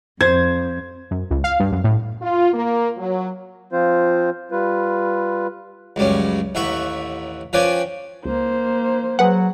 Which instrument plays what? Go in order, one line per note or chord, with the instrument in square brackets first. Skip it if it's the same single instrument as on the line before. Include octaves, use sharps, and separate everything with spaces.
[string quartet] F2 [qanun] C5 [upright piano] G#6
[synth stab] F#2
C#2
F5
G2
F#2
A2
[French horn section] F4
A#3
F#3
[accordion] F3 C4 F4 C5
G3 F4 B4
[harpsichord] C#2 F#2 G3 C#4
A1 D#2 E5 F#5 B5 C#6
F3 C#4 B4 D5 G5 G#5
[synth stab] C#2 [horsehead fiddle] A#3 C5
[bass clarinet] F#3 [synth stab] G#4 B4 F#5